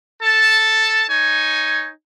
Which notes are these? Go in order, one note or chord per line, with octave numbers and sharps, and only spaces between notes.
A4 A5
D#4 C#5 G#5